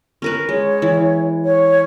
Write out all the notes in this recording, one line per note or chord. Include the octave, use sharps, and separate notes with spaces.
C#4 A#4 B4
G#3 C#5
E3
C#5